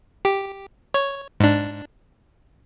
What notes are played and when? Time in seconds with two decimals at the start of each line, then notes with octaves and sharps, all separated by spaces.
0.25 G4
0.94 C#5
1.40 G#2 D4